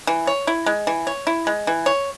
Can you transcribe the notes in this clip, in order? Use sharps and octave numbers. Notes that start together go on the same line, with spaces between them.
E3
C#5
E4
G#3
E3
C#5
E4
G#3
E3
C#5